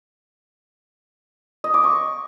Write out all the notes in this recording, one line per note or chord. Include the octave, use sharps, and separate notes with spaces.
D#5
D6
C#6